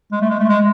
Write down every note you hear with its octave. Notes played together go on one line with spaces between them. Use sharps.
G#3
A3
G#3
A3
G#3